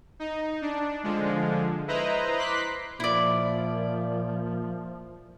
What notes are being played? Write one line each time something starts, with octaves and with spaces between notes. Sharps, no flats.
D#4
D4
D3 F3 G#3
E4 B4 C5 D#5 A#5
C6 D6 F#6 B6
A#2 F3 E4 D5